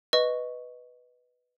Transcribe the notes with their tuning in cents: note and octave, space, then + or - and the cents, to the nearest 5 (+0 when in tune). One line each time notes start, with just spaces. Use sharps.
B4 +0 D#5 +0 C#6 +0